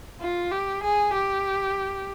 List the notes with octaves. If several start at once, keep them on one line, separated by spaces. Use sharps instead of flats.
F4
G4
G#4
G4